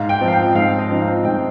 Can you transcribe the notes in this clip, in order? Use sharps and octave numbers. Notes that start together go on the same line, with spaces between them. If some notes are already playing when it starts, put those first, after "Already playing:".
Already playing: G#2 F5
G5
F3 C4 D#4
F5
G5
G#2 F5
D#5
F3 C4 D#4
F5
G#2 G5